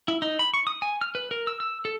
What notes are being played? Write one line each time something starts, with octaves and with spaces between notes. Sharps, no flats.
E4
D#4
B5
C#6
D#6
G#5
F6
B4
A#4
E6
E6
A4